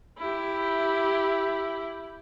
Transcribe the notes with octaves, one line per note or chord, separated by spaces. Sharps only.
E4 G4